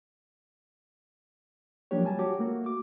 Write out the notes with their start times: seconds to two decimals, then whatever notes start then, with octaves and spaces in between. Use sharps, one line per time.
1.91 F3 F#3 A#3 D4 G4 C#5
2.05 G3 G#5 A5
2.19 F#4 G4 C#5 D6
2.39 A3 A#3 F#4
2.66 D6